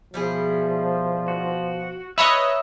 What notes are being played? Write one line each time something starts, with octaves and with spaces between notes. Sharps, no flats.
B2 F3 G3 E4 G#4
F#4
D#4 B4 C#5 D#5 E5 B5 E6